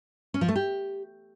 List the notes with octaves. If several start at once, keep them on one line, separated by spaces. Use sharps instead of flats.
C#4
F3
A3
G4